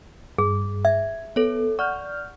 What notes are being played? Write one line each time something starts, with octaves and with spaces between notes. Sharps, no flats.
G2 G#4
E5 G#6
B3 A4 C#5
D5 F#5 C#6 F6 G6